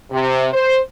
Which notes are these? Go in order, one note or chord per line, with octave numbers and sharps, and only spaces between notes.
C3
C5